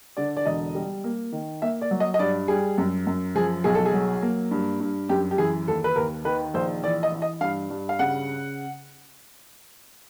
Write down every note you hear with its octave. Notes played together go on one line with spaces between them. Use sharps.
D3 D5
D5
E1 D#5
G3
A#3
D#3
A#3 E5
D5
F#3
D#5
D#5
G2 D5
G3 G#4
F#2
F#2
F3 G#4
B1 G#4
A4
G#4
F#3
A#3
G2
G2
F#2 G4
G4
E3 G#4
D#2 A4
B4
D#2 A#4
D#3 B4
A#1 C5
E3 D5
D#5
E3
D#5
G2 F5
G2
F5
C#3 F#5